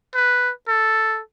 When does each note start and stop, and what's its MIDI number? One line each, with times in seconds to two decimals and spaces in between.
0.15 0.51 71
0.68 1.20 69